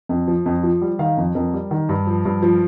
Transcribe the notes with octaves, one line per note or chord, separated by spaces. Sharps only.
F2
F3
F2
F3
G3
D#3 F5
F2
F2 A#4
G3
D#3
G2
F3
G2
F3